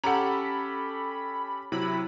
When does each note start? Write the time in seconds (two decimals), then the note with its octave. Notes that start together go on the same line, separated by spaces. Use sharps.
0.04 C#4 G4 A4 F#5 A#5 B5
1.72 C3 F#3 E4 B5